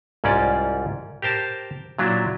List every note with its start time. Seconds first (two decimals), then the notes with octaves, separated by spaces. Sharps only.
0.24 C2 G#2 C#4 F4 D5
1.22 G4 A#4 C5 A5
1.99 A#2 F#3 D4 E4